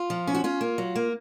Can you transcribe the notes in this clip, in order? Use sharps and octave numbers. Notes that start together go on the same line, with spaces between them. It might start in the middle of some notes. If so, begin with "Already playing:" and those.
Already playing: F4
F3
C#4
F#4
C#4 F4
A#3
F#3
A#3